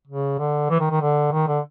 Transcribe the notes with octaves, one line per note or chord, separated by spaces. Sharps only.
C#3
D3
E3
D#3
D#3
D3
D#3
D3